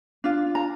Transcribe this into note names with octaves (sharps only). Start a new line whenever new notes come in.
D4 F4
A#5